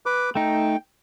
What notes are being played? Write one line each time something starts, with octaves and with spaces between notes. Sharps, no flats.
B4 D6
A3 D#4 G5